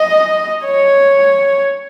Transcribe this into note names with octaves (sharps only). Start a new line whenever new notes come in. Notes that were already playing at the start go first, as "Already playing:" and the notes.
Already playing: D#5
C#5